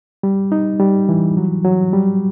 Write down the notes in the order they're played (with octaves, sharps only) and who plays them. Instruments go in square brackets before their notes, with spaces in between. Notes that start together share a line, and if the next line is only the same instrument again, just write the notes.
[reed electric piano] G3
D#4
G3
E3
F#3
F#3
G3